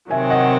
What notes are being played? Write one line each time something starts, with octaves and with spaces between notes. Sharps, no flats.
C3 D#3 F#3 C4 E5 G#5
D#5 F#5